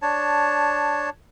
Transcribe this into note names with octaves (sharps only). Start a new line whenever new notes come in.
D4 C#5 A5